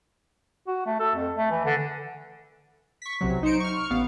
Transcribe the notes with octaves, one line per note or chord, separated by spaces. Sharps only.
F#4
A3
A4
F2
A3
E3
D3
C#6 B6
B1 C3 F#3
D#4 C5 C#7 D7
C#6 F6
A1 B3 F5